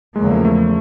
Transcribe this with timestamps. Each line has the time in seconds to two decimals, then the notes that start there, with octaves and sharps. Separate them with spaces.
0.15 E2 C#3 F3 G#3 A#3
0.30 A3
0.45 A3